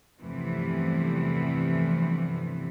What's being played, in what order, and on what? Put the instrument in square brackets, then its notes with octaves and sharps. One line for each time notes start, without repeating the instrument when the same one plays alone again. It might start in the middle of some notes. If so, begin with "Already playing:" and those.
[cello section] E2 G2 C3 E3 F3 A3